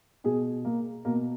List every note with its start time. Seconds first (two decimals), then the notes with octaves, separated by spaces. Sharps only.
0.24 B2 G#4
0.65 A#3
1.05 B2 A#3